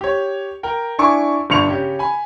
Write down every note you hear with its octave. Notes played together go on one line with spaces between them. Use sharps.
G4 C#5
A#4 G5
D4 E4 G#5 C#6 D6
G1 G2 D4 C#6 C#7 F7
C#3 C#4 G4
G#5 B5